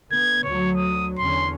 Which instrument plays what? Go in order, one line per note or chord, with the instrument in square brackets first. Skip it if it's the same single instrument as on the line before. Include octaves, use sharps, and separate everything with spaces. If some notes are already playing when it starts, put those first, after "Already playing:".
[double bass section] D3 B3 [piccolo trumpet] G#6
[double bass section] D2 D3 F#3 [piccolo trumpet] C#5
[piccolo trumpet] D#6
[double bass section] E2 D3 C#4 [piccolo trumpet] C6